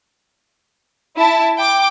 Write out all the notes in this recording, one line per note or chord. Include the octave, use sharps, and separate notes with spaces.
E4 A5
G5 D6